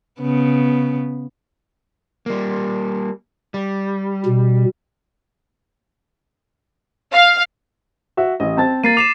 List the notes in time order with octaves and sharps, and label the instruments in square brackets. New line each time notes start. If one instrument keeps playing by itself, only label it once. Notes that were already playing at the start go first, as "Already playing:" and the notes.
[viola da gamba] C#3 B3
[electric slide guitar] G3 A#3
G3
[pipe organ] B2
[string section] F5
[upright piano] F#4 E5
A1 D#5
C4 A5 A6
[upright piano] A#3 [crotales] A6 C7 D#7
[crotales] D6 C7 E7 [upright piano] F7